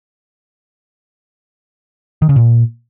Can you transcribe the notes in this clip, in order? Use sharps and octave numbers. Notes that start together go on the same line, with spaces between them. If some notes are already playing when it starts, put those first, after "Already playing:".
D#3
C#3
A#2